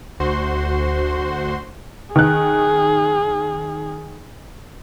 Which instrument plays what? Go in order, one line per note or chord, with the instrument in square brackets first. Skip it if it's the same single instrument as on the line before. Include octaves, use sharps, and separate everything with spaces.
[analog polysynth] D2 F#4 C5 C6
[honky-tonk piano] D#3 F#6 [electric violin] G#4